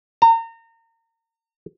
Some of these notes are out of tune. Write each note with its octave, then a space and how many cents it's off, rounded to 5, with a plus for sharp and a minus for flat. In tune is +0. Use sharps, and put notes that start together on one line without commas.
A#5 -30